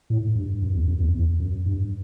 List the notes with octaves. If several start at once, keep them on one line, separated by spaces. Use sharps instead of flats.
A2
G2
F#2
E2
F#2
E2
E2
F#2
G2